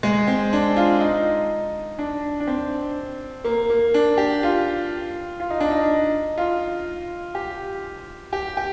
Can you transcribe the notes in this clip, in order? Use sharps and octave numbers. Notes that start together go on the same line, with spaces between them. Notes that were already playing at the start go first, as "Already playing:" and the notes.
G#3
C4
D4
F4
D#4
D4
D4
C4
A#3
A#3
D4
G4
F4
F4
D#4
D4
D#4
F4
G4
G4
G4